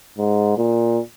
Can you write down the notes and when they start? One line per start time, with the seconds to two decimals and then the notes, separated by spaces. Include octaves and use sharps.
0.18 G#2
0.58 A#2